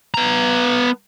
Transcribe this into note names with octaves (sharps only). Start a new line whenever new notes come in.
B3 A#5